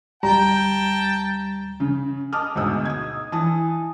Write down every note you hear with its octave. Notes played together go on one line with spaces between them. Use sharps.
D2 G3 G5 A5 A#5
C#3
D#5 A5 D6 D#6 F6
D2 G#2 B2 D#6 E6
D#6 G#6
E3 A5 D#6